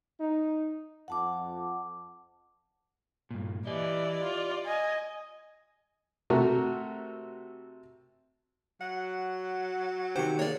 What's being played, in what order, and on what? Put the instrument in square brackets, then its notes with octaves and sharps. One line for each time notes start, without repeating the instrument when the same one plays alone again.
[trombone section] D#4
[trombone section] F2 [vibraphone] F#5 A5 D6
[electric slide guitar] G2 A#2
[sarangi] E3 [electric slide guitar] G4 D#5 [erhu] D5
[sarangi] F4
[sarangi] D#5 [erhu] G#5
[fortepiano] C3 A3 F#4 A#4
[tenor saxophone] F#3 [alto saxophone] F#5
[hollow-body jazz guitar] C3 D#3 G4 [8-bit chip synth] C5 C#7
[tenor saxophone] G#3 [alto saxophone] A#3 [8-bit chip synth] C#5 D5